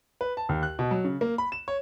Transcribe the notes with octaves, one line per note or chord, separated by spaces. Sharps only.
B4
A5
D#2
F#6
B2
F#3
C#3
A#3
B5
E7
C#5